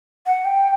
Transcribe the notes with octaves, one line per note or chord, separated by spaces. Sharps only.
F#5
G5